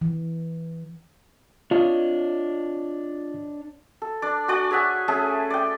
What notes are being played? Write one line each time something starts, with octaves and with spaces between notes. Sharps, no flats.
E3
D4 F4 C#5 D#5
A4
D4 D5
F#4 D5 G#5
G#4 C#5 E5 F#5
A3 C#4 G#4 A4
D5 G5